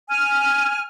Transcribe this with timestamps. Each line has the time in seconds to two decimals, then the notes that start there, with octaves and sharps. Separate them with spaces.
0.09 G#5 F6